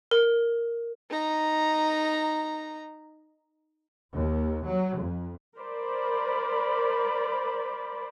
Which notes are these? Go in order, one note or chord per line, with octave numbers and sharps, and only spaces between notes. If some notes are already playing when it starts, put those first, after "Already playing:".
A#4
D#4 A#5
D#2
F#3
F2
A#4 C5 D5 B5